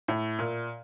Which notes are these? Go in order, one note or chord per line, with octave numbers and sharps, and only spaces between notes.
A2
A#2